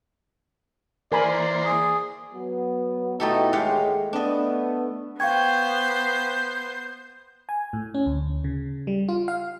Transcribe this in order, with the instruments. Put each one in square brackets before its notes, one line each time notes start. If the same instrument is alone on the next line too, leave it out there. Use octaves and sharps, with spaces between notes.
[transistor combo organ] E3 A#3 C5 [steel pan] A#4 G#5 B5 [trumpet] D5
[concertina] G#4
[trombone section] F#3 B3
[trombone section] B2 D#4 E4 [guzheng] A3 G4 A4
[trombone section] D#2 A2 G#3 [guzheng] G4 F5 F#5
[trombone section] A3 B3 [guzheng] D4 D#5
[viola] B3 C5 [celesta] F5 G#6 [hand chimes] G5 C#6 [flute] G6
[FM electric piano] G#5
A2
C#4
D2
C#3
G3
F4
F5